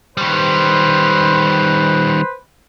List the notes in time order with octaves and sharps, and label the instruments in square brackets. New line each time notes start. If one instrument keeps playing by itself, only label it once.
[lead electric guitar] D#3 G3 [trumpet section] B4 C5